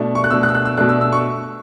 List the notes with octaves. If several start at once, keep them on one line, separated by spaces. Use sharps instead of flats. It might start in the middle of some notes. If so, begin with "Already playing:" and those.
Already playing: B2 A3 D4
C#6
F#6
B2 A3 D4 E6
F#6
E6
F#6
E6
B2 A3 D4 F#6
E6
E6
C#6